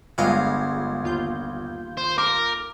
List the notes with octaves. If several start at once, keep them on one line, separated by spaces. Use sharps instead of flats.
G1 G2 G#3 F4 F5 A#5
D#2 F4 G6
C5
A#4 D6